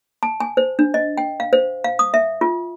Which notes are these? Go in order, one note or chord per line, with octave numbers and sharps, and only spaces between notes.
A5
G#5
C5
D4
D#5
G5
F5
C5
F5
D#6
E5
F4